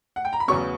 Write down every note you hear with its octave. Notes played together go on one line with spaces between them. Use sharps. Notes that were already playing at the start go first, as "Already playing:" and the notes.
F#5
G5
A#5
B5
E2 C#3 F#3 B3 C#6